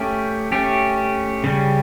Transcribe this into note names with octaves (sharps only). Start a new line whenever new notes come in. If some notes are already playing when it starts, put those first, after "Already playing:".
Already playing: A3 C#4 G4
A3 C#4 G4
C#3 G3 C#4